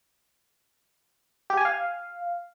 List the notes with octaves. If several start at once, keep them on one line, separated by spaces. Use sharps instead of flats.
G4
G#5
F5